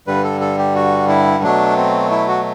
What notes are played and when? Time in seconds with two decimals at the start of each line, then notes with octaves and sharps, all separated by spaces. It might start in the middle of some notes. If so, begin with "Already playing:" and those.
0.07 G2 D3 G3 B4
0.24 A4
0.41 A4
0.59 G4
0.75 F#4
1.09 E4
1.43 B2 F#3 A3 D4
1.77 C4
2.11 E4
2.28 F#4